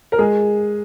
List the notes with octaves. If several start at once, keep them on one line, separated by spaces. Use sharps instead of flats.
A#4
G#3 G#4